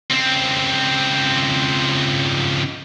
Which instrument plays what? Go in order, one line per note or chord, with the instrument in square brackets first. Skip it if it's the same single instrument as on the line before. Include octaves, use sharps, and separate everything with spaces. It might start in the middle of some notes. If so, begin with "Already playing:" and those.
[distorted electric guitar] C#2 C4